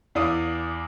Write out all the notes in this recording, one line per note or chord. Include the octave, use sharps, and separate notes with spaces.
E2 E4 D5 F5 D#6